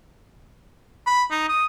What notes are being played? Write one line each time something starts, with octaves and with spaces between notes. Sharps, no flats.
B5
D#4
D#6